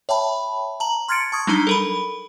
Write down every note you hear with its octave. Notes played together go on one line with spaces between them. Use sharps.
C#5 E5 G5 A5 B5
A5 A#5 F#7
C6 F6 G#6 A6 C#7 D7
A5 C#6 D#6 G#6
F#3 G3 D4 D#4 A#5 G7
A4 A#4 B5